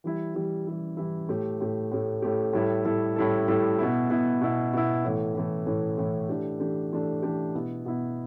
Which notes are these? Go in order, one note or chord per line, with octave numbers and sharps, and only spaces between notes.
E3 G3 E4
E3 G3 E4
E3 G3 E4
E3 G3 E4
A2 A3 G4
A2 A3 G4
A2 A3 G4
A2 A3 G4
A2 G3 E4 A4
A2 G3 E4 A4
A2 G3 E4 A4
A2 G3 E4 A4
B2 B3 E4
B2 B3 E4
B2 B3 E4
B2 B3 E4
A2 E3 A3
A2 E3 A3
A2 E3 A3
A2 E3 A3
E3 A3 D4 G4
E3 A3 D4 G4
E3 A3 D4 G4
E3 A3 D4 G4
B2 B3 E4
B2 B3 E4